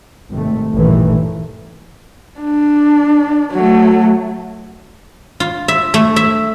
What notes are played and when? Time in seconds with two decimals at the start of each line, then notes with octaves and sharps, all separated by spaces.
0.30 G#1 C3 A3
0.73 A1 G2 A#2 D#3 E3 A3
2.40 D4
3.52 F#3 A3
5.40 F4
5.68 E5
5.94 A3
6.16 E5